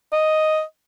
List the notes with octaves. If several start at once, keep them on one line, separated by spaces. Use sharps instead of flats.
D#5